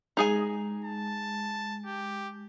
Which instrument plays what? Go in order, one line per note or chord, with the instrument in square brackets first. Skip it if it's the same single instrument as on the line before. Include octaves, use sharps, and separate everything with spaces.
[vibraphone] G#3 [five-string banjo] D#4 G#4 G#5
[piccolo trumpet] A5
G4